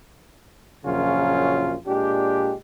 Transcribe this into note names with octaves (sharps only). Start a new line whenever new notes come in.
A#1 F#2 C#3 F#3 C#4 F4
A#2 G#3 D4 G4